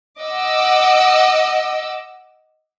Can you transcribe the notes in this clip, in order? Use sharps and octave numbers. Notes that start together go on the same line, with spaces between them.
D#5 F#5 D6 E6